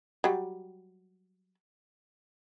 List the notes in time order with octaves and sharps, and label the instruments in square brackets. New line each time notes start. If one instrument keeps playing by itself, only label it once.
[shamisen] F#3 G3